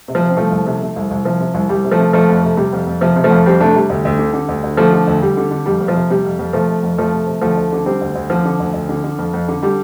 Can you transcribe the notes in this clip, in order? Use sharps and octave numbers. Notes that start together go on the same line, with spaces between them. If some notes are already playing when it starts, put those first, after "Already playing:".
C3
F3
C3
C4
C2 F3 A3
C2
C3
C3
C2
C2
C3 F3
C3
C2
C2 G3
C3
F3 A3
C3
F2 F3 A3
F2
C3
C3 G3
F2
F2
C3 F3
C3
F3 A3
F2
F2 G3 C4
C3 A3 D4
C3 G3
D2
D2
D3
D3
D2
D2
D3 F3 A3
D3
D2
D2 G3
D3
D3
F2 G3
F2
F3
C3
C3 G3
F2
F2
C3 F3 A3
C3
F2
F2 F3 A3
C3
C3
D2 F3 A3
D2
D3
D3 G3 C4
D2
D2
D3 F3
D3
D2
D2
D3
D3
F2
F2
D3
D3 G3